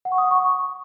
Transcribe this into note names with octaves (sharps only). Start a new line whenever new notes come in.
F#5
C#6
D#6
F#5
C#6